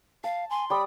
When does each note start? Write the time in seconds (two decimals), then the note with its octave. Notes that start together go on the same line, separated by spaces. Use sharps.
0.24 F5 A5
0.50 G#5 C6
0.70 G3 D5 B5 D#6